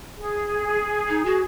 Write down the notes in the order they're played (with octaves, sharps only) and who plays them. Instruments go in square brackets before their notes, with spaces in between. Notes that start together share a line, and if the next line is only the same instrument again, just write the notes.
[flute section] G#4
[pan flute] D#4
F#4